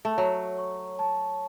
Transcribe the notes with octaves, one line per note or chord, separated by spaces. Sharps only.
A3
F#3 C#5
C#6
A5